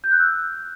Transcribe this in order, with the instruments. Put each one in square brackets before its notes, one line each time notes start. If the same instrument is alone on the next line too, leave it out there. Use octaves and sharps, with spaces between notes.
[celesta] G6
F#6
E6